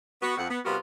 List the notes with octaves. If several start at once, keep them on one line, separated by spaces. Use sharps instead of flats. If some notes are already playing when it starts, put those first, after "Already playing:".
B3 F#4
F2 F#5
B3
C3 G3 B3 F4 F#4 A#4